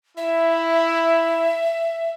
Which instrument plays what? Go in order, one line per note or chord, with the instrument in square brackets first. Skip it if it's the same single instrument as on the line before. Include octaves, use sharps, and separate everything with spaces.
[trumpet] E4 [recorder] E5